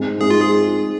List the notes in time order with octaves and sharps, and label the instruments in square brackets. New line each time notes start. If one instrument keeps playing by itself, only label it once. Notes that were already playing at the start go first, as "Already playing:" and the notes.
Already playing: [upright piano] G#2 G#3 C4
[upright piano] G#2 G#3 C4 [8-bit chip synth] G#4
[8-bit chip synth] F4
G#4